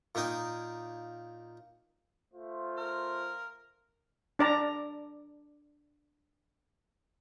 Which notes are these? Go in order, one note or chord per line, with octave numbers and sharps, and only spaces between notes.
A#2 A#3 D#4 G5 D#6
A3 F4 C5
A#4
D4 D5 A#5